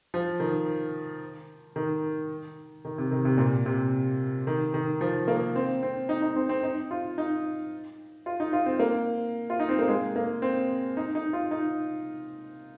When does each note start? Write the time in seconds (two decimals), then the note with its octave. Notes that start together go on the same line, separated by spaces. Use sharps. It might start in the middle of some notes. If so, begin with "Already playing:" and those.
0.14 F3
0.40 D#3
1.76 D#3
2.85 D#3
2.98 C3
3.11 D#3
3.25 C3
3.38 A#2
3.66 C3
4.47 D#3
4.74 D#3
5.01 F3
5.28 A#3
5.56 C4
5.83 C4
6.09 D#4
6.22 D#4
6.36 C4
6.49 C4
6.63 D#4
6.91 F4
7.18 D#4
8.26 F4
8.40 D#4
8.53 F4
8.66 C4
8.79 A#3
9.50 F4
9.60 D#4
9.69 C4
9.79 A#3
9.88 G#3
10.16 A#3
10.42 C4
10.97 D#4
11.15 D#4
11.33 F4
11.51 D#4